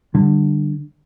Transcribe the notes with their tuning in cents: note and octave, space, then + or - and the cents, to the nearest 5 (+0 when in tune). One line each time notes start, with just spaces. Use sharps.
D3 +15 G3 +0